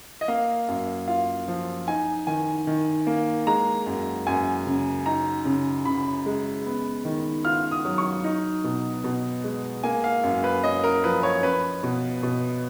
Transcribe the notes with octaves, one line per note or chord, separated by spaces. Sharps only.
D#5
A#3 F5
F#2
F4 F5
F3
D#4 G#5
D#3 G#5
D#3
A#3
G#3 A#5
F#2
F#2 G#5
C#3
D#4 A#5
C#3
C#3 B5
G#3
B3
D#3
F4 F6
D#6
F#3
C#6
D#4
B2
B2
G#3
A#3 G#5
F5
F#2
B4
C#4 D#5
A#4
F3 B4
C#5
C#4 B4
B2
B2